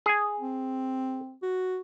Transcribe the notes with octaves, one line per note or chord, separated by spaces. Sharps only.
G#4 G#5
C4
F#4